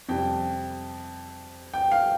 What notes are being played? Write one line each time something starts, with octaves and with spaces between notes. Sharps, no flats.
F2 C3 G3 G5
G5
F5